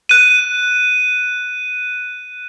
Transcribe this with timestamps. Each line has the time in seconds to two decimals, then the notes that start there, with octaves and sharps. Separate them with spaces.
0.09 F#6 D#7